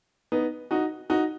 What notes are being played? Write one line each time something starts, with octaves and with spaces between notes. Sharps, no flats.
B3 D#4
D#4 F#4
D#4 F#4